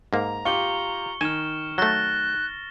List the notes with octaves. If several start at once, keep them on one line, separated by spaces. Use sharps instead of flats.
G#2 A#3 A#5
F4 G4 C#6 C#7 G7
D#3 G#5 F6 E7
F#3 A3 F#6 A6 A#6 G7